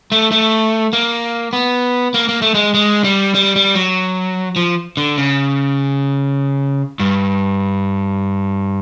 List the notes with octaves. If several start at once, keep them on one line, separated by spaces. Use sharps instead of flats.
A3
A3
A#3
B3
A#3
A#3
A3
G#3
G#3
G3
G3
G3
F#3
F3
D3
C#3
G2